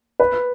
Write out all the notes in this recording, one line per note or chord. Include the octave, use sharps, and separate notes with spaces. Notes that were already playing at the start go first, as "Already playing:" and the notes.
B4